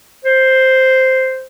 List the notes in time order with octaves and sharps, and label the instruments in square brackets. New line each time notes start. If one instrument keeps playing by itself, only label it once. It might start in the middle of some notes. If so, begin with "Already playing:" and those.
[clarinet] C5